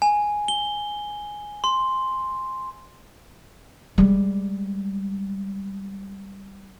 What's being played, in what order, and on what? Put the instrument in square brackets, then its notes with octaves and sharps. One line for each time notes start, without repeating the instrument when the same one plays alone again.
[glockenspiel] G#5
G7
C6
[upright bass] G3 G#3